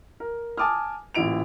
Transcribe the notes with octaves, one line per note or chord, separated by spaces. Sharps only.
A#4
G#5 A5 D6 D#6 F6
D1 A1 A#2 E4 D7 F7